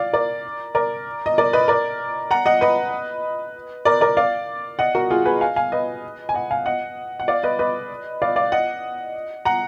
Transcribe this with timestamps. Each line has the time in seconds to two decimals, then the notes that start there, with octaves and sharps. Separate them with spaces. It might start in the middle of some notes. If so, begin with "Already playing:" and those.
Already playing: D5 F5
0.13 A#4 D5
0.75 A#4 D5
1.26 D#5
1.38 A#4 D5
1.53 B4 D#5
1.68 A#4 D5
2.31 F#5 A#5
2.46 D#5 F#5
2.61 B4 D#5
3.85 A#4 D5
4.01 A#4 D5
4.17 D5 F5
4.79 D#5 F#5
4.95 F#4 A#4
5.11 F4 G#4
5.25 G#4 B4
5.41 F5 G#5
5.56 F5 G#5
5.72 B4 D#5
6.29 G#5
6.34 D#5 F#5
6.51 F5 G#5
6.66 D#5 F#5
7.20 F#5
7.28 D5 F5
7.43 B4 D#5
7.59 B4 D#5
8.22 D5 F5
8.36 D5 F5
8.52 D#5 F#5
9.45 F#5 A#5